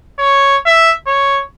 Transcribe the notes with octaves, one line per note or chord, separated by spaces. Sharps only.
C#5
E5
C#5